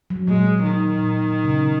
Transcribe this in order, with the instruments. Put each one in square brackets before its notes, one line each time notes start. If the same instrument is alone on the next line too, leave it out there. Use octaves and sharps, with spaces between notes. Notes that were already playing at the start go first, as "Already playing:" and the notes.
[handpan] F#3
[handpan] A#2 [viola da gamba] G#3
[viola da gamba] D#3
[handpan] A#2
A#2
C#3